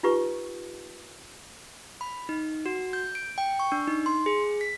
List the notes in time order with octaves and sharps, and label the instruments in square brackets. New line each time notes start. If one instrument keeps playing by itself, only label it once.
[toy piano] D#4 F4 G4 B4 C#6
[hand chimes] B5
D#4
F#4
G6
D7
G5
C#6
D4
D#4
C6
G#4
B6